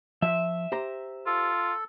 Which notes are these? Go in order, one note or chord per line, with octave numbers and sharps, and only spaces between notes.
F3 E5
G4 C5 A#5
F4 A4